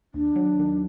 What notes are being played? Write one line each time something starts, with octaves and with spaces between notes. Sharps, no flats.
D#2 D4
F#3
D#3